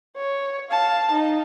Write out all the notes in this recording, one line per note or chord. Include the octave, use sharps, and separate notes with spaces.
C#5
F5 A5
D#4